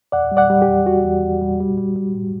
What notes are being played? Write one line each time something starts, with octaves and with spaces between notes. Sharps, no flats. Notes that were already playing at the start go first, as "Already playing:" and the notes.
E2 D5 F#5
G3
D5 F#5
G3
G4
E2
E2 F#4
E2
E2
G3
G3
G3
G3
A2